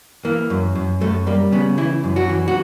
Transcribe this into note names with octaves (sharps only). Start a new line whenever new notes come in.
E3 A#3
F#2
F#2
F#2 A3
G3 A#3
C#3 B3
E3 E4
F#2
F#4
E3
F#4